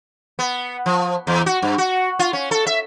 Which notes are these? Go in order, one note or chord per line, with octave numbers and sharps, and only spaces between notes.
B3
F3
E2
F#4
G2
F#4
F4
C#4
A4
E5